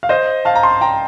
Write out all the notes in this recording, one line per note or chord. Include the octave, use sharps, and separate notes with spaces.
F5
C5 D#5
F5 A5
A#5
A5 C6
G5 A#5